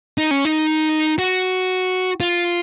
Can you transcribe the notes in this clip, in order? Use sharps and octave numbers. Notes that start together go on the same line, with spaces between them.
D#4
C#4
D#4
F#4
F4